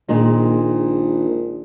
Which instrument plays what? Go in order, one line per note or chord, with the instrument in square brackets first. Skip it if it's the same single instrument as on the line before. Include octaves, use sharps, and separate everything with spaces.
[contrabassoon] A#1 [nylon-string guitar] A#2 D#3 G#3